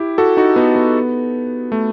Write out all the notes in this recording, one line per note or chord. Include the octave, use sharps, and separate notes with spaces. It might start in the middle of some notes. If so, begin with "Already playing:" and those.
Already playing: E4 G4
F#4 A4
D#4 F#4
B3 D#4
B3
A3